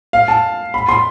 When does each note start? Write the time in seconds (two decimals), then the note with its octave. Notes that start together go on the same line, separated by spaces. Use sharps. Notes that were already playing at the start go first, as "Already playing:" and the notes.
0.13 F5
0.28 A5
0.74 B5
0.89 C6